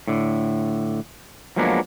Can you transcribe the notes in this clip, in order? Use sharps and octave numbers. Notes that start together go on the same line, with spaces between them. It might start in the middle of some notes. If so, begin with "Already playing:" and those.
A2 D3
F3 F#3 G#3 A#3 B3 D4